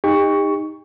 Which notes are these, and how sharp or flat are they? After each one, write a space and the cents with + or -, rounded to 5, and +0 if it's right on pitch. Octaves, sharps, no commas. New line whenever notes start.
D#4 +0 G4 +40 C#6 +10